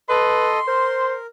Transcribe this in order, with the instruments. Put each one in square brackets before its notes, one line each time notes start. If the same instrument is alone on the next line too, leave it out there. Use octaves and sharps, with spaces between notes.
[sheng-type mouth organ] A4 D#5 [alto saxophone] B4 [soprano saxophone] C6
[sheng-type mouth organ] A#4 [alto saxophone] C5